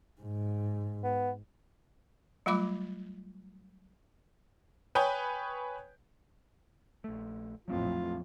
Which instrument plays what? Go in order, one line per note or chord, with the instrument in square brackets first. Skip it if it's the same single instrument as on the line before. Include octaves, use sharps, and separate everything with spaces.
[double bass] G#2
[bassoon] B3
[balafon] F#3 G3 A3 F4 B5 D6
[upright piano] B4 C#5 G5 G#5 D#6 G6
[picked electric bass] A#1 A3
[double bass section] A#1 F2 A2 [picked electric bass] F#3 A3 C4 [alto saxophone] F4